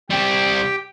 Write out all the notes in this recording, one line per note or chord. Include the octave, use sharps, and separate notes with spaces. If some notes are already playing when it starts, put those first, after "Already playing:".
G3 C4 G4 G5